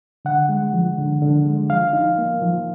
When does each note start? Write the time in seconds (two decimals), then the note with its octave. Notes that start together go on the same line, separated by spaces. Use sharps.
0.25 D3 F#5
0.49 G#3
0.73 F3
0.98 D3
1.22 D3
1.45 G#3
1.69 F3 F5
1.93 D#4
2.18 A#3
2.42 F3